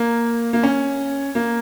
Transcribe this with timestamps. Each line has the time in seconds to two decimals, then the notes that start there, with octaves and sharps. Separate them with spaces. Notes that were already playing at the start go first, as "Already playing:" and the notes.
Already playing: A#3
0.53 A#3
0.63 C#4
1.35 A#3